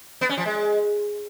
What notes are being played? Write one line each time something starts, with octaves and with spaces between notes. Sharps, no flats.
B3
C#4
F3
G#3